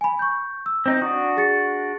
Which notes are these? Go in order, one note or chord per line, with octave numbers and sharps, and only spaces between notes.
G#5 B5
C#6 G6
E6
C4 D#4
D4 F#4 D#6
G#4 A6 C#7